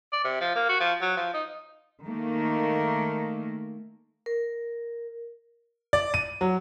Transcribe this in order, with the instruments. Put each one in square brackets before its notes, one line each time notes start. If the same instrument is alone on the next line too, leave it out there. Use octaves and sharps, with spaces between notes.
[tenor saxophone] D5
C3
F3
A#3
F#4
F3
F#3
F3
D#4
[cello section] D#3 A3 A#3
[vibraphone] A#4
[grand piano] D5
D#7
F#3